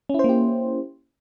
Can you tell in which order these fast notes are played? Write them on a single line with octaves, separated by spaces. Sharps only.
C#4 E4 C5 A#3 G4